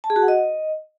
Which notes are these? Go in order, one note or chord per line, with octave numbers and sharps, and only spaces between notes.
A5
G#4
F#4
F#5
D#5